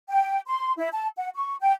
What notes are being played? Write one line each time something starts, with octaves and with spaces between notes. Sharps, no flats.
G5
C6
E4
A5
F#5
C#6
G5